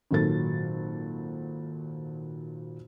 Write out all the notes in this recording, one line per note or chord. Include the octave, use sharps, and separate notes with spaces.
G#1 A#2 F#3 A4 A6